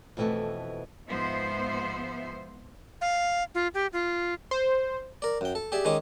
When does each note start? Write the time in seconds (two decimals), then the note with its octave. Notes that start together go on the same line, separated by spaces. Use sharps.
0.17 F2 B2 E3 G3 A3
1.08 G#2 F3 B3 C5 E5
3.01 F5
3.55 F4
3.74 G4
3.93 F4
4.51 C5
5.22 A#4 D5
5.41 F#2 G5
5.55 A4
5.72 G4 G#4 D5 E5
5.85 D#3 G#3 C#4 D6 D#6